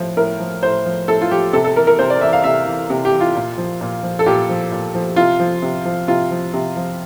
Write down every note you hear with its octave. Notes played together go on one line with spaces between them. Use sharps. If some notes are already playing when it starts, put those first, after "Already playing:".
Already playing: A2 F3
A2 A#4
F3
A2 C5
F3
A2 A4
F4
F3 G4
C3 A4
A4
E3 A#4
A#4
C3 C5
D5
E3 E5
F5
C3 E5
E3
C3
G4
E3
F4
A#2
F3
A#2
F3
A4
A#2 G4
F3
A#2
F3
C3 F4
F3
C3
F3
C3 F4
F3
C3
F3